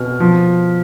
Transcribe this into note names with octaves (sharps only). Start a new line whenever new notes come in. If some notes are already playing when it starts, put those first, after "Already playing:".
Already playing: B2 F6
F3